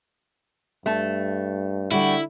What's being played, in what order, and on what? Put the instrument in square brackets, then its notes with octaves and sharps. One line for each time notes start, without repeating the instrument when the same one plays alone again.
[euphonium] G2 [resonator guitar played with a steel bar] A3 A5
[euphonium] D3 [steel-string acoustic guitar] G3 F#4 [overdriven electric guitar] E4